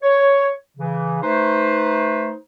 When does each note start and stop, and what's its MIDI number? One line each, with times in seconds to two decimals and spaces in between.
0.03 0.51 73
0.78 1.18 49
0.78 1.18 52
1.23 2.33 57
1.23 2.33 63
1.23 2.33 71
1.23 2.33 72